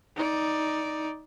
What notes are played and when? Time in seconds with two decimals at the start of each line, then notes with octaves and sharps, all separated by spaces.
0.16 D#4 D5